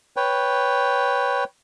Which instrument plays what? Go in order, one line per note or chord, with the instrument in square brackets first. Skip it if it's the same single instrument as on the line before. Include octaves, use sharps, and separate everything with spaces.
[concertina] B4 C#5 G5